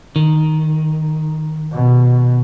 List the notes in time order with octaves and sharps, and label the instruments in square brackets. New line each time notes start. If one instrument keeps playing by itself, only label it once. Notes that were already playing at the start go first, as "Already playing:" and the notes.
[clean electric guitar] D#3
[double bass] B2